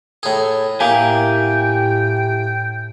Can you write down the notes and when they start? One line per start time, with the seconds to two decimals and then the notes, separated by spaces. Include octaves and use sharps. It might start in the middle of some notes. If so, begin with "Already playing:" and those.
0.23 A2 G#4
0.80 A2 A#3 E4 G4 G5 G#5